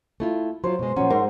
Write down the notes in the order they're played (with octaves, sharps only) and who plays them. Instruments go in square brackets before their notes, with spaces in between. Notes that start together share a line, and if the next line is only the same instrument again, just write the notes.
[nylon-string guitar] A3 E4 F4
[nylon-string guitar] F#3 F4 [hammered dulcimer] C5
[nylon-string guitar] B2 G#3
[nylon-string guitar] A#2 F3 C#4 [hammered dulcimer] F#3
[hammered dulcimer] G#2 [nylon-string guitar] A#4